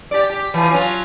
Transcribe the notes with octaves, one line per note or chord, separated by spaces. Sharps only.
G4 D5
G4
E3 F3
F#3 C#4 F4